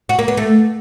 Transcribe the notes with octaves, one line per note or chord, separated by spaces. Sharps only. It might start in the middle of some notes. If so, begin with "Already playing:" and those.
F#4
A#3
B3
A3